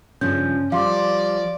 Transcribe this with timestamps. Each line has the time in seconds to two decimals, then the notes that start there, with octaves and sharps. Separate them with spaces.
0.21 G2 C#3 F3 C#4 G6
0.72 F3 G3 D5 F5 C6 D6